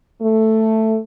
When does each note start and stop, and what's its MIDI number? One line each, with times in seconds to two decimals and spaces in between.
0.21 0.97 57